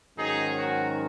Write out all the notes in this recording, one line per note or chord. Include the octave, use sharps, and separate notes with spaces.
G#2 D#3 F#3 C#4 D#4 G#4
F#4